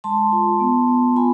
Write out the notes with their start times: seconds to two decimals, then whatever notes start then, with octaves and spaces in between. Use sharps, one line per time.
0.04 G#3 A5 C6
0.32 F4
0.60 B3
0.88 B3
1.16 F4 G#5 B5